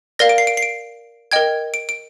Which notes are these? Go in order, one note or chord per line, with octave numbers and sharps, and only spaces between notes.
A#4 D5 F5 A#6
D7
C7
D7
C7
D7
A#4 D#5 G5 G#6
D7
D7